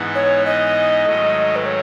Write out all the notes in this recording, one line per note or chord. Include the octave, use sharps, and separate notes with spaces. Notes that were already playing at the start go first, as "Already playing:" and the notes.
Already playing: G#2 E3 B3 D#4
C#5
D#5
G#2 D#3 F#3 A3
B4
C#5